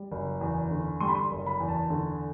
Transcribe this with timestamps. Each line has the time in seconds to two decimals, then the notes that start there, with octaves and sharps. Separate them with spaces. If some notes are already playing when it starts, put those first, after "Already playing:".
Already playing: G3
0.12 F#1
0.41 E2
0.71 D3
1.00 G3 C6
1.08 B5
1.15 C6
1.31 F#1
1.46 B5
1.60 E2
1.68 A5
1.90 D3